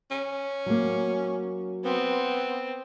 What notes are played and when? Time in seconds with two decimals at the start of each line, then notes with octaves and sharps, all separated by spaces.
0.11 C#4
0.66 F#3 A#3
1.85 B3 C4